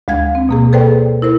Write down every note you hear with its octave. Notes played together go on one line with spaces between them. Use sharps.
D2 G#3 F5 G#6
C4
B2 A#3 G#4
G#4 A4 B4 C5 D5 G5
E4 A#4 C5